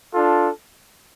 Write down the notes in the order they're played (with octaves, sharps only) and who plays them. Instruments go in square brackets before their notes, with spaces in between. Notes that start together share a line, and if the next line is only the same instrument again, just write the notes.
[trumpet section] D4 F4 A4